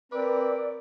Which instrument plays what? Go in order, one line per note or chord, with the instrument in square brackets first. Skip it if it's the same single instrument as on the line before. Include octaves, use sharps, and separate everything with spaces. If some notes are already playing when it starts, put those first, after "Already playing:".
[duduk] C4 [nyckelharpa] A#4 [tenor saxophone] B4 [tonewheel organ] D5